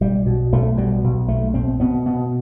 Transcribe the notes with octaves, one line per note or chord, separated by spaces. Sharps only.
B1 G3
B2
B1 A3
B2 G3
B1
B1 A3
B2 C4
B2 B3
B2 B3